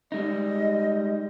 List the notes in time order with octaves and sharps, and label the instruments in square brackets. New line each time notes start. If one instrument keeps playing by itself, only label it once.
[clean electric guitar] G3 G#3 D#4 [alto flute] D#5